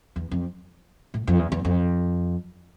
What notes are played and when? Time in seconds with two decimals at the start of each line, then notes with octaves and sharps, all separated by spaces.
0.16 E2
0.31 F2
1.14 A2
1.27 F2
1.39 E2
1.52 E2
1.65 F2